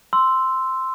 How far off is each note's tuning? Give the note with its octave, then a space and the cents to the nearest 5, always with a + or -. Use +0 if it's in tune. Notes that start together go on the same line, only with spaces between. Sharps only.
C6 -5 E6 +0